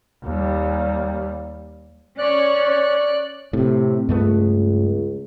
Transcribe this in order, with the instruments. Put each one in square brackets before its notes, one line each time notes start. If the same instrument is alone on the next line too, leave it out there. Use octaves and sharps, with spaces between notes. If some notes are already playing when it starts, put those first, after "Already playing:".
[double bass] D#2 G3
[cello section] C#4 C#5 [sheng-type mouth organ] D5 F#6
[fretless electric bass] A2 [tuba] C3
[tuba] C#2 [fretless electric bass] G2 A3 B3